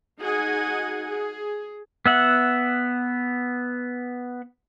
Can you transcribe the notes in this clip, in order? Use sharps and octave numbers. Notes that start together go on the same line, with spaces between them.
D#4 F#4 G#4 D#5 F#5 G#5
G#4
B3 E5 F#5